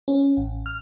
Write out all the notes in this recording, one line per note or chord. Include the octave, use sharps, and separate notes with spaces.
C#4
A1
F6